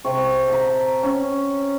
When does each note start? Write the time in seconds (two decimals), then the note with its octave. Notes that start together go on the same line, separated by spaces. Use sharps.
0.05 C3 C#6
0.48 A5 A#5
1.03 C#4